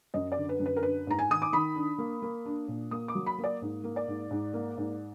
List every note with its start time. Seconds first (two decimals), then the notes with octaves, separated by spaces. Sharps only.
0.14 F#2 D#5
0.32 D5
0.38 D3
0.49 B4
0.59 F#2
0.66 B4
0.76 A#4
0.83 D4 B4
1.07 G#2 A#5
1.19 G#5
1.30 D#3 D#6
1.42 D6
1.53 D#3 B5
1.76 D4
1.98 A#3
2.22 A#3
2.45 D4
2.68 A#2
2.91 A#3 D#6
3.08 D6
3.15 F#3
3.26 B5
3.38 A#3
3.44 D5
3.62 G#2
3.84 A#3
3.96 D5
4.08 G#2
4.31 G#2
4.53 A#3
4.77 G#2